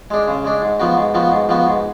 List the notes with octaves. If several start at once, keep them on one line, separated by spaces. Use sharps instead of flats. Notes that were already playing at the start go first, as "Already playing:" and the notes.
G#3 D4
C#3
G#3 D4
G#2
F3 B3 F#4
G#2
F3 B3 F#4
G#2
F3 B3 F#4
G#2